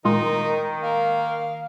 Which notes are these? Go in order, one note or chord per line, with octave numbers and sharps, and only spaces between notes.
A#2 D#3 G#3 D#4 F4 A#4
A#3 F5